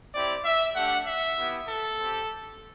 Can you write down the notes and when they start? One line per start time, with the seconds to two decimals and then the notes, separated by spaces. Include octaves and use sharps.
0.14 C4 E4 G4 D5
0.45 E5
0.76 A3 D4 G4 F#5
1.06 E5
1.38 B3 E4 G4
1.68 A4
1.98 C4 G4